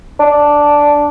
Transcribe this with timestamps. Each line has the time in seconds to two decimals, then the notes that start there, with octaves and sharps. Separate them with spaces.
0.20 D4